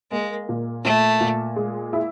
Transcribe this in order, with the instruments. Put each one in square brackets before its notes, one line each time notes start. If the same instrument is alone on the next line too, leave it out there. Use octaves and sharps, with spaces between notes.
[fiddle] G#3 [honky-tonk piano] A#3
[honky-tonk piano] A#2
[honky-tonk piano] A#2 [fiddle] A3
[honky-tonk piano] A#2
G#3
E4